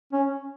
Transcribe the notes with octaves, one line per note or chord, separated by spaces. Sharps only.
C#4